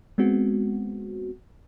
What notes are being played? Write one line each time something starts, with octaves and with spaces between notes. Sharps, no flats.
G#3 B3 C4 F#4